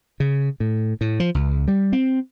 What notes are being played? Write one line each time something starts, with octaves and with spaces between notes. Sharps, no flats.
C#3
A2
A2
F3
C#2
G3
C4